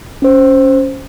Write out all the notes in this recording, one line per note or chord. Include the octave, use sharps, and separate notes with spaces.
C#4 C5